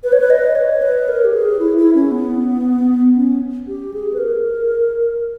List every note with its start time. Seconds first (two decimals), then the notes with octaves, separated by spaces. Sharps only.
0.03 B4
0.12 C#5
0.20 B4
0.30 D#5
0.55 C#5
0.82 B4
1.08 A#4
1.25 G4
1.33 G#4
1.59 E4
1.77 E4
1.95 C#4
2.11 B3
3.15 C#4
3.68 G4
3.94 G#4
4.14 B4
4.19 A#4